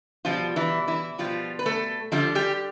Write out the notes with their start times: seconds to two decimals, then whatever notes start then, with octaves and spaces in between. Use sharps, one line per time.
0.25 B2 F3 G3 F4
0.56 E3 E4
0.87 E3 E4
1.18 B2 F3 G3 F4
1.59 B4
1.66 A3 A4
2.12 D3 F3 G3 F4
2.35 G3 G4